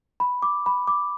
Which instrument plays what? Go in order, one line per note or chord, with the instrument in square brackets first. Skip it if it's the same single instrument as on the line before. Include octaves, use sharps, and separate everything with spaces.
[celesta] B5
D6
B5
D6